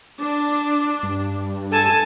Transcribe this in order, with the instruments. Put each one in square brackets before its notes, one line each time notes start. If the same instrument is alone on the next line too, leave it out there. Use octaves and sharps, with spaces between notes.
[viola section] D4
[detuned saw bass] G2
[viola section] A4 G#5 A5